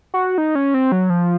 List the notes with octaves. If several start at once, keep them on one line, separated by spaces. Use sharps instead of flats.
F#4
D#4
C#4
C4
F#3
F3